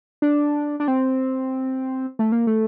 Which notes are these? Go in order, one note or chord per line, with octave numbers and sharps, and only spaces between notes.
D4
D4
C4
A3
A#3
A3